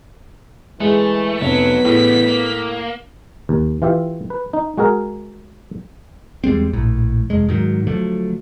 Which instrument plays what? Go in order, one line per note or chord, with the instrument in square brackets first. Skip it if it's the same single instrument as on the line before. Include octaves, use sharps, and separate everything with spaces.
[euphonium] E3 [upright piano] G#3 [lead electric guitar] A3
[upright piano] F1 [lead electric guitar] F#3 [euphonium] B3 [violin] B6
[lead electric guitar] E2 C#3 [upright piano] A2
[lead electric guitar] A#3
[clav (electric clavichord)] D#2
E3 F4 G4 E5
B4
D#4
G#3 F#4 G#4 A#4
[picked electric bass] E2 G3 G#3 C4
A#1 A2
F1 G#3
G#2 D#3 F#3
D3 F3 F#3 A3